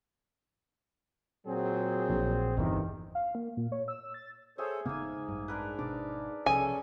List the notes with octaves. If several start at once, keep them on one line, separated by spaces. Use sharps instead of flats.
A#2 F#3 C4 G#4
A#1
G1 E2 C3 D#3
F5
A#3
A#2
C#5
E6
A6
G#4 A4 C5 C#5 E5
E1 G#2 C#3 A#3 B3 G#5
A1 G2
D4 A#4 B4
G#1 B2 D4 D5
B1 C3 F3 C#4 G#4 A4 G#5